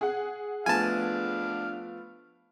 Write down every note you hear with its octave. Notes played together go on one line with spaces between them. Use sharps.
G#4 F#5
F3 A3 B3 D4 F5 G#5 A5